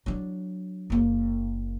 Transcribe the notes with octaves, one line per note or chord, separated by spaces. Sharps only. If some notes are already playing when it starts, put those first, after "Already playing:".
F#3 D4
F#1 A#3